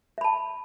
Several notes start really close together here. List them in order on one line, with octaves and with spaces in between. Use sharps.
E5 B5 A5